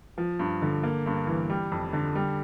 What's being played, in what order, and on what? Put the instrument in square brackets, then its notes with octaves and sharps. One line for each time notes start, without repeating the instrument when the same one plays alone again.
[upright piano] F3
G2
D3
A#3
G2
E3
G3
F2
D3
G3